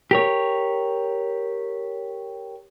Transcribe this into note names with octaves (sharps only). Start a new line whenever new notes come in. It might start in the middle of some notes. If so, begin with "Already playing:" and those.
G4 A#4 C#5